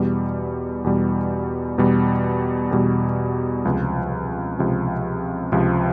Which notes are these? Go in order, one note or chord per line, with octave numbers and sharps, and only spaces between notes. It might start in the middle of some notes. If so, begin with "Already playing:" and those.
Already playing: E2 B2 G3
E2 B2 G3
E2 B2 G3
E2 B2 G3
C#2 C3 F3
C#2 C3 F3
C#2 C3 F3